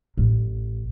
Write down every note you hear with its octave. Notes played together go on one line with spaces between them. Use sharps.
A1